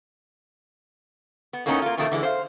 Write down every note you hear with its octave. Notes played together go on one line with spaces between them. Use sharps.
B3
A2 A#3 B3 C#4 D#4
A#3 F4
B2 D#3 F3 A3 A#3
D3 E3 G#3
C5 F5